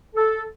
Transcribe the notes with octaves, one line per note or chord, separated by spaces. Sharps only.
A4